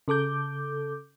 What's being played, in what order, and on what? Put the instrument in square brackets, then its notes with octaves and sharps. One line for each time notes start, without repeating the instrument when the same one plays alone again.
[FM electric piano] C#3 A4 D6 G6